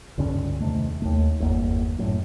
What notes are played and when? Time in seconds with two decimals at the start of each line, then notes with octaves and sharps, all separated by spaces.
0.18 C#2 G2 D3 C#4
0.60 E2 C3 D#3 A3
1.02 D#2 A3
1.40 G1 E2 A#3
1.98 F#2 A2